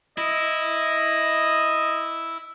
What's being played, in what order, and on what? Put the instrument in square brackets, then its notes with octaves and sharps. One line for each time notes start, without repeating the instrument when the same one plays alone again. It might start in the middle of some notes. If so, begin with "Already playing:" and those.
[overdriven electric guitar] E4 [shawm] D#5